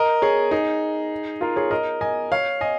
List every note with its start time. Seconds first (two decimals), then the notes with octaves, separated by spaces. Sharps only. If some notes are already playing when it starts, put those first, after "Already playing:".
Already playing: A#4 D#5
0.22 G#4 C#5
0.51 D#4 G#4
1.41 F4 A#4
1.56 G#4 C#5
1.71 A#4 D#5
2.01 D#5 G#5
2.32 C#5 F5
2.61 D#5 G#5